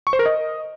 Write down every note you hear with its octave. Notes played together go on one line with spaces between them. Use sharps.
C#6
C5
A#4
D#5